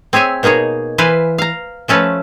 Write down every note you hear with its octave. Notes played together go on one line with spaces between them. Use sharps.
C4 G#4 C#5 E5 G#5
B2 A#3 D#4 G#4 C#5
E3 B4 C5 F5 G#5
F5 A#5
F3 A3 C#4 A4 B4